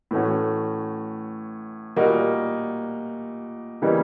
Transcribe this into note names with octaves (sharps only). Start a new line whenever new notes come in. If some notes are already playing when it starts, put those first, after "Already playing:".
A2 E3 A3 C#4 F#4
A#2 G3 A#3 D#4 F#4
C#3 E3 G3 A#3 D#4